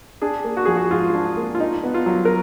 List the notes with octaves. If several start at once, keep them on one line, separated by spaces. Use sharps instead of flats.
D4 G#4
A#3
F#4
F3 G#4
F#4
G#2 F4
D4
A#3
F4
D4 D#4
B3
F4
F#3
A#4